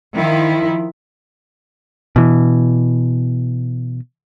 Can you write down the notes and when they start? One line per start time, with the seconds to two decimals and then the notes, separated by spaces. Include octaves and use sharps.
0.14 D#3 F3 E4
2.16 B2 E3